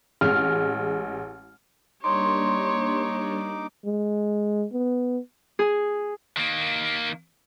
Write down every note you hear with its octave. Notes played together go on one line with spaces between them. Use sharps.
A1 G#3 F6
G3 A#3 D4 D#4 C#5 C6 D6
G#3
B3
G#4
D#3 A#3